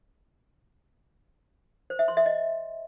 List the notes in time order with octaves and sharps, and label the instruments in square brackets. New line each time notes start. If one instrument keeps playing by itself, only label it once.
[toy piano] C5
E5
C6
E5
D#5